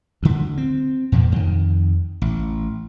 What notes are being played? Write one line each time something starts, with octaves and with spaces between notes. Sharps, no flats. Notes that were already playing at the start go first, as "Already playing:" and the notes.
D2 D3
C4
E2 A#2 F3 A#3
F2 D#3
A1